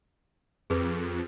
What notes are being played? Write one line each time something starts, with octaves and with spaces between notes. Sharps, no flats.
F2 G#4 B4